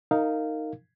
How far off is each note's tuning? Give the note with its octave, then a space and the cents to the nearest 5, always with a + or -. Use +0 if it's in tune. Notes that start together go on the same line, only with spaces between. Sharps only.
D#4 +0 A#4 -20 F5 -5